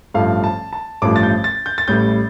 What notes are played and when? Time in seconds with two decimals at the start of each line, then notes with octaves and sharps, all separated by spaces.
0.14 A1 G2 F3 A3 F5
0.44 A5
0.73 A5
1.02 A1 G2 F3 A3 D6
1.16 A6
1.23 G6
1.44 A6
1.66 G6
1.78 A6
1.88 A1 A2 G3 G6